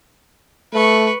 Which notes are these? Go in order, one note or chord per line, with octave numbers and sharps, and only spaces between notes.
A3 B4 C#6